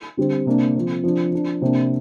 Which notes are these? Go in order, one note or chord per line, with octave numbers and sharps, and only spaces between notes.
D3 G3 C4
C3 A#3 D4
F3 C4
F3 D4
F3 D4
C3 A#3 D4